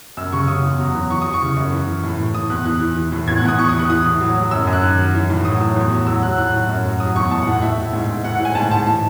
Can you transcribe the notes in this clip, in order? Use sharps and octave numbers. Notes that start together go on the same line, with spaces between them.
F#2 E6
C#3 C#6
C#3 D#6
E2
F#3
E2
E3 C#6
E3 D#6
C#6
C#3
F#2
E3
E3
A2
A2
E3 D#6
E2 F#6
E3 F#6
E3
E3
A2
E2 G#6
F#6
E2 D#6
E3 C#6
D#6
E3 F#6
E3 D#6
A2
F#3
F#3
F#2 E6
F#2
F#6
D#3
F#3
E3
A2
F#3 D#6
A2
E2
F#3
F#3 E6
F#3 F#6
A2 F#6
A2
F#2
F#3
F#3 D#6
E2 C#6
A2 A5
F#5
A2
F#5
A2 E5
A2
G#2
G#2
A2 F#5
F#5
A2 G#5
G#2 A5
G#2 A5
E3 A5